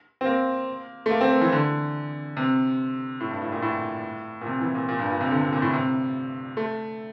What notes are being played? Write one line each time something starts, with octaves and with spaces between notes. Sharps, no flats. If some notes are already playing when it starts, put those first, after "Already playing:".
C4
A#3
A3
A#3
C4
A#3
E3
D3
C3
A2
G2
A2
A#2
A2
A#2
C3
E3
A#2
A#2
G2
A#2
C3
D3
C3
A#2
A2
C3
A3